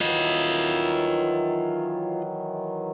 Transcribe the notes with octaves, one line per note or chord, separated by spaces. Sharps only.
D#3 E3 F#3 F4 D#5